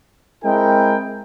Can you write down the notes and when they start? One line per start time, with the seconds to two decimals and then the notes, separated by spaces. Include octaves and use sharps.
0.44 G#3 C4 E4 A#4 G5